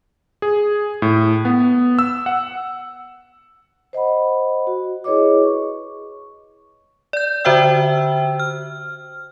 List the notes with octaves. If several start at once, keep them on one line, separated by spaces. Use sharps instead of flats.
G#4
A2
B3
E6
F#5
C5 D#5 F#5 B5
F#4
E4 G#4 B4 C#5 D#5 D6
C#6
D5 G6
D3 F#4 C5 E5 G5 E6
F6